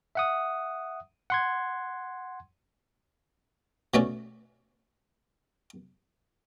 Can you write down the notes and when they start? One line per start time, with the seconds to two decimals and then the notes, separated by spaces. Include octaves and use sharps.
0.15 E5 F#5 D#6
1.30 F#5 C6 G#6
3.94 B2 A3 C#4 D5